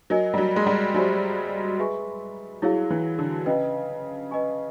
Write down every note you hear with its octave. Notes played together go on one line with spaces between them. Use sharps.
F#3 A#4 D#5 G#5
G3
F#3
G#3
G3
F#3 G4 C5 E5 G#5 B5
G#4 B4 E5 G#5 C#6
F#3 E4 G#4 C#5 F5
E3
D3
C#3 B4 D#5 G5
B4 D#5 G#5 C#6